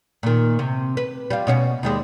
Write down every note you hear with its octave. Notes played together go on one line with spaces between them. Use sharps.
A#2 D#3
C3
B4
G3 F4
B2 C#4 F#4
D#2 G3 G#3